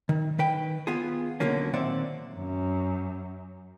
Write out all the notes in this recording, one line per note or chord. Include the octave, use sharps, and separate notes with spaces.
D#3
D#3 B4 G5
B3 F4 G#4
B1 D3 F#3 A#3 C#4
A#2 D#3 C4 D5 E5 F#5
F#2